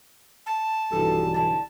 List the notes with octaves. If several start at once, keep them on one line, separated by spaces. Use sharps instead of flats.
A5
B1 G2 C3 E3 F3 G3 A4
D3 E4 A5